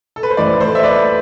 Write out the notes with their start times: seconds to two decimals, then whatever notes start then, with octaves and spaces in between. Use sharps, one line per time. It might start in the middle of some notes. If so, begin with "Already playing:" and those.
0.16 A4
0.23 B4
0.31 C5
0.37 A1 A2 E3 A3 B4 D5
0.60 A4 C5
0.75 E5
0.83 B4 D5